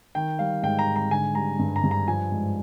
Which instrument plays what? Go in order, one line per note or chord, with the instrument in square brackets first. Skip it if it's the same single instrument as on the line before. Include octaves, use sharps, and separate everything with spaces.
[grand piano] D#3 G5
G3 F5
G#2 G5
A#5
G#2
A#5
D3 G#5
G3 A#5
G2
A#5
G2
A#5
F3 G#5
G#2